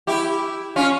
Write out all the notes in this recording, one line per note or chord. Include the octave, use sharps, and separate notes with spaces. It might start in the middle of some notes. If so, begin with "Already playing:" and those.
E4 G4
C#4 F4